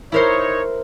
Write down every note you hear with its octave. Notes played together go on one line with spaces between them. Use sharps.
D#4 E4 A#4 C5 C#5